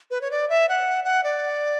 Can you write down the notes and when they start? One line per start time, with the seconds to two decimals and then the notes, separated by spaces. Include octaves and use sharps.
0.11 B4
0.21 C#5
0.31 D5
0.50 E5
0.69 F#5
1.04 F#5
1.24 D5